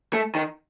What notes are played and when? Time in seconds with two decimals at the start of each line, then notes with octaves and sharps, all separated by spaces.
0.13 A3
0.35 D#3